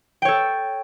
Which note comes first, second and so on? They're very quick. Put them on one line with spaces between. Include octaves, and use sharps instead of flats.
G5 C#5 A4